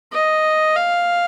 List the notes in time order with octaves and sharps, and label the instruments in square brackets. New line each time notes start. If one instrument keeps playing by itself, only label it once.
[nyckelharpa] D#5
F5